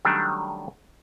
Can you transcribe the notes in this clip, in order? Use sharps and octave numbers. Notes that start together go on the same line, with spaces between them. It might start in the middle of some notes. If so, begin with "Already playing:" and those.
D#3 F#3 G3 A3 C#4 D4